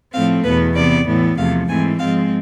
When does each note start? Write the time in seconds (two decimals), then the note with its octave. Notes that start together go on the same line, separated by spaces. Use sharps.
0.13 A2 F3 A3 C4 F5
0.44 E2 B2 B3 B4
0.76 C3 E3 B3 D5
1.07 A2 E3 B3
1.37 E2 C3 F3 A3 F5
1.69 G#2 E3 A3 C4 G#5
1.99 G#2 F3 G#3 C4 F5